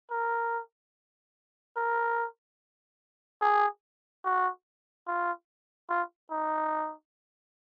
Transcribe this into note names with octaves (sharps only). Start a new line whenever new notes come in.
A#4
A#4
G#4
F#4
F4
F4
D#4